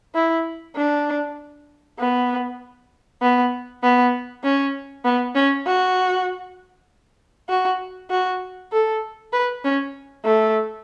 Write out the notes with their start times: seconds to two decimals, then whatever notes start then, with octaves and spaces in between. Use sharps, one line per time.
0.15 E4
0.76 D4
1.99 B3
3.22 B3
3.83 B3
4.43 C#4
5.05 B3
5.35 C#4
5.66 F#4
7.49 F#4
8.10 F#4
8.72 A4
9.33 B4
9.64 C#4
10.24 A3